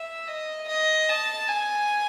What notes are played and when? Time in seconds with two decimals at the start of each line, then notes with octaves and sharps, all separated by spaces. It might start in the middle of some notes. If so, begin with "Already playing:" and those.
Already playing: E5
0.27 D#5
0.68 D#5
1.08 A5
1.48 G#5